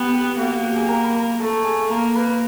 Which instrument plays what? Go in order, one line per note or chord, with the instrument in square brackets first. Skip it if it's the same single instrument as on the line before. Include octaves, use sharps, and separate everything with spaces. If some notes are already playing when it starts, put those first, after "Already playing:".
Already playing: [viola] B3 [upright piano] G4 G5
[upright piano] G4 G5
[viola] A#3 [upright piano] F#4 F#5
[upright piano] F#4 F#5
G4 G5
G#4 G#5
A#4 A#5
B5
A#4 A#5
[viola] A3 [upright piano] A4 A5
[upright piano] G#4 G#5
[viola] A#3 [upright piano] A#4 A#5
[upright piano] B4 B5